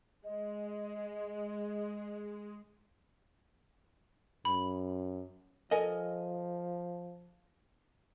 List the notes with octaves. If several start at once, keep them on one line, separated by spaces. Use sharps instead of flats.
G#3 D#5
F#2 B5
F3 A4 A#4 D#5 G#5